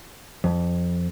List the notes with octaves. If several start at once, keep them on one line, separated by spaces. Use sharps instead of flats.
F2